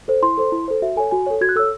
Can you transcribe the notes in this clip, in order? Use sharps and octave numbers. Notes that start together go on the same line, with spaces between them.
A4 C5
E4 C6
A4 C5
E4
A4 C5
F#4 E5
A4 C#5 G#5
F#4 G#5
A4 C#5
F#4 G#6
F#6
A4 C#5 E6